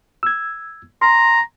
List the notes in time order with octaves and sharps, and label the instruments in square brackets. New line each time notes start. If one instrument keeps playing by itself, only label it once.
[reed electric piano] E6 G#6
[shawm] A#5 [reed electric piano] C6